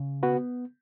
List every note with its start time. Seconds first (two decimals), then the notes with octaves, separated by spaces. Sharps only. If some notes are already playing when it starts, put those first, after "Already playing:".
Already playing: C#3
0.23 B3 F#4 B4